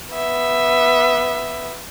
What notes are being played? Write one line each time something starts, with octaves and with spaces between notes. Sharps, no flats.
B3 E5